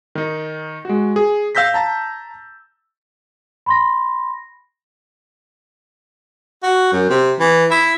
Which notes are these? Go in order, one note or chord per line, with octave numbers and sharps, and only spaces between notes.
D#3 D#4
G#3 F#4
G#4
F5 E6 G6 A#6 B6
A5 A#5 A6
B5 C6 A#6
F#4
F#2
C3
E3
E4